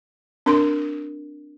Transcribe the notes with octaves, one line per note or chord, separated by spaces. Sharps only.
C4 D4 A#4 C6